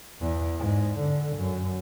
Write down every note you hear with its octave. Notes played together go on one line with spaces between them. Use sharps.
E2
G#2
D3
F#2